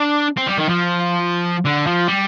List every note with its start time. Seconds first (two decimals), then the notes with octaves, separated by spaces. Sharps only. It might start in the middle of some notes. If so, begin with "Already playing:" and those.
Already playing: D4
0.37 C4
0.47 G3
0.58 D#3
0.68 F3
1.65 D3
1.87 F3
2.08 G3